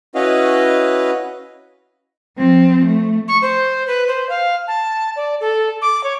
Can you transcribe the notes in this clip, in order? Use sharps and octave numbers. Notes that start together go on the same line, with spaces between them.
C#4 E4 F#4 B4 D#5 F5
F3 C4
A3
C#6
C5
B4
C5
F5
A5
D5
A4
D6
C#5